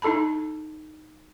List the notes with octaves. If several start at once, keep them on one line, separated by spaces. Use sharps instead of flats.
D#4 E4 A4 A5 B5